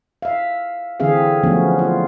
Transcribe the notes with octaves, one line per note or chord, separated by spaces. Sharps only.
E5 F5
D3 E3 C4 G#4 E5 F5
D3 F3 F#3 A3 B3 C#4
F4